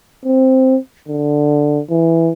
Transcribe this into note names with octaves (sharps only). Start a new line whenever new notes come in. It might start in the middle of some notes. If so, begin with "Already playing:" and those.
C4
D3
E3